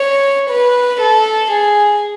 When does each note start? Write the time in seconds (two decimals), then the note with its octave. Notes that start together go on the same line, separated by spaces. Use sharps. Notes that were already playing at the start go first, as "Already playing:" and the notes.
Already playing: C#5
0.50 B4
1.01 A4
1.51 G#4